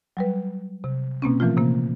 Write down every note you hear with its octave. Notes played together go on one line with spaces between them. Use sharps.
F#3 G3 B4
C3
B2 A#3 C4 C#4
A#2 E3 F3 A3 F4
C3 A#3